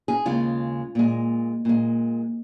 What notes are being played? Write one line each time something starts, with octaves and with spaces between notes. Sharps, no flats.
G#4
D#2 C#3 G#3 F4
A#2 G#3
A#2 G#3